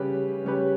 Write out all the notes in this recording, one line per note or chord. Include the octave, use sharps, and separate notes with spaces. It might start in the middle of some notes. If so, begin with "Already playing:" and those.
Already playing: C#3 G3 C#4 G4 B4
C#3 G3 C#4 G4 B4